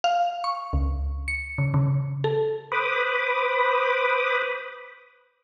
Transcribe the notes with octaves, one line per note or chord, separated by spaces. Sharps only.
F5
C#6
C#2
C#7
C#3
C#3
A4
B4 C5 B5 D6 D#6